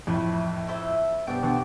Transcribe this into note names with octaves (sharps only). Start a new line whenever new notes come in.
F2 A2 A3 C4 E4 B4
E4 A4 C5 E5
G2 B2 C4 G4 D5 G5
B2 D3